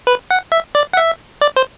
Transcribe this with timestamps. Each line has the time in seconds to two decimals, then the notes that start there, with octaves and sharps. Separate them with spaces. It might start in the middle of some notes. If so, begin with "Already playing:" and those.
0.07 B4
0.31 F#5
0.52 E5
0.75 D5
0.93 F#5
0.97 E5
1.41 D5
1.56 C5